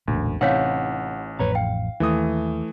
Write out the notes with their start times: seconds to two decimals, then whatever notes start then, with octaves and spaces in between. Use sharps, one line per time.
0.08 E1 A1 D2 A#2
0.41 A1 C3 D#4 C#5 F5 F#5 B6
1.39 A1 F2 A2 B4 C#5 A#5
1.55 F5 G5
2.00 D#2 E3 A3 D#6